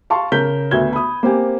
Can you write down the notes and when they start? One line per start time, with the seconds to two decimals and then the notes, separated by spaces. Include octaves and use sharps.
0.10 F5 A5 C6 C#6
0.32 C#3 A#4 G6 B6 G7
0.71 D2 B3 F#4 E5 G#6 G7
0.93 B5 D#6
1.23 A#3 C4 G4 G#5